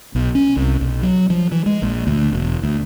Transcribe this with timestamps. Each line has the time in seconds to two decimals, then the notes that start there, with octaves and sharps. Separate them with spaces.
0.15 B1
0.35 C#4
0.57 C2
0.81 B1
1.02 F#3
1.30 F3
1.52 E3
1.66 G#3
1.82 A#1
2.07 D2
2.33 E1
2.63 D2